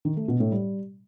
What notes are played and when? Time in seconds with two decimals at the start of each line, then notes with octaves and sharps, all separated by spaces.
0.05 D#3
0.17 A3
0.28 B2
0.40 A2
0.52 G3